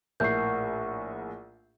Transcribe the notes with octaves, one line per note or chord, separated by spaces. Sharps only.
A#1 A2 A#4 E5 F#5 C#6 G6 C7